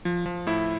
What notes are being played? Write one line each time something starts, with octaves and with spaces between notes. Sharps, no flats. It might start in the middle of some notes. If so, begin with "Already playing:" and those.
F3
F3
A2 E4